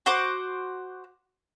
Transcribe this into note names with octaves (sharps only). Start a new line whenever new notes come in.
F#4 C5 F#5 D6